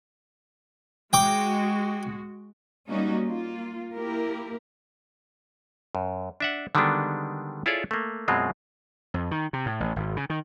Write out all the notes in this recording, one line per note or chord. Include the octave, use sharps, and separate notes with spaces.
G#3 F#4 G5 D6
G3 A#3 C#4 D#4 F#4
A#3 F4
A#3 E4 G4 A#4
F#2
D4 E5 F#5
D3 D#3 G3 G#3 B3 D4
E4 F4 G#4 A4 C#5 D5
A3 A#3
F#2 B2 F#3 G#3 C4 F4
F2
D#3
C3
A2
A1
G#1
C#3
D#3